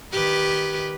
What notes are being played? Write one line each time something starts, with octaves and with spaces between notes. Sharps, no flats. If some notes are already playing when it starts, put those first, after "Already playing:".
D#3 G4 B4